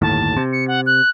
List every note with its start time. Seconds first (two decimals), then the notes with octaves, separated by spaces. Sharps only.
0.02 G1 D#2 A2 A5
0.37 C3
0.52 C#7
0.68 F#5
0.86 F#6